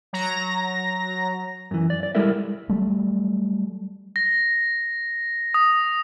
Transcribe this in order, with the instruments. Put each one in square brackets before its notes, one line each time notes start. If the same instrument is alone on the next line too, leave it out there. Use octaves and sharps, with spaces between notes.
[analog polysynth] F#3 A#5 A#6
[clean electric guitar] F#2 E3
D5
D5
G3 G#3 E4 A4 A#4 E5
[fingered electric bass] F#3 G3 A3
[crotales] A#6
D#6